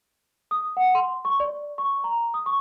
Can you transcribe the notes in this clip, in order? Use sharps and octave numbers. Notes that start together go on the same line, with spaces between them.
D#6
F#5
C6
C#6
D5
C#6
A#5
D#6
C#6